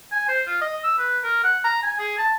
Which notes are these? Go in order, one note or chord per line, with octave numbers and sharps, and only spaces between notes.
G#5
C5
F4
D#5
E6
B4
A#4
F#5
A#5
G#5
G#4
A5